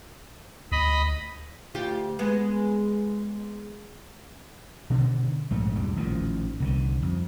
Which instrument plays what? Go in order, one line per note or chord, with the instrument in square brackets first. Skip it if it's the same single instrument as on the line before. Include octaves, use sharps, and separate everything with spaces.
[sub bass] D2 [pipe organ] D#5 B5
[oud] D2 F4 G4
G#3 B3
[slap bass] B2 D3 D#3
A#1 G#2 A3
E1 E2 G3
A1 A#2 D#3 F3
C2 D3 D#3
F2